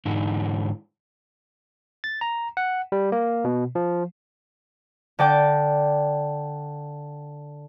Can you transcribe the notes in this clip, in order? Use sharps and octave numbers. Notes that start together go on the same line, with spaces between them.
G#2 D3 E3 D#4 E4
A6
A#5
F#5
G3
A#3
B2
F3
D3 D5 G5 D6